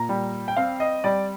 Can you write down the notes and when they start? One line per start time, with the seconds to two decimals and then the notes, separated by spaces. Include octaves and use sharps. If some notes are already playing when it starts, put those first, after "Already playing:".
Already playing: A#2 A#5
0.09 G3
0.48 G5
0.57 C4 F5
0.80 D#5
1.04 G3 D5